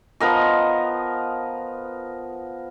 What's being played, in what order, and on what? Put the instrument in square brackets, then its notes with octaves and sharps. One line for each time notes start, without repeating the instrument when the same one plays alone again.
[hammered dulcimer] F3 B3 A#4 D#5